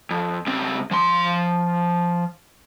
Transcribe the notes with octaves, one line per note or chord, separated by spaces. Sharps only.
F2
C#2 C4
F3 C6